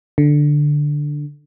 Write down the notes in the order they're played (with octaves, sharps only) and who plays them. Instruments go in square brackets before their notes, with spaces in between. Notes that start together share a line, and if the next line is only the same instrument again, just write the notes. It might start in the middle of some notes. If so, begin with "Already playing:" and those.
[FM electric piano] D3